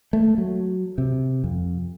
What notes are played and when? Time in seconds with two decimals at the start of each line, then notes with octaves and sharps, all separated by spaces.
0.13 A3
0.38 F#3
0.98 C3
1.44 F2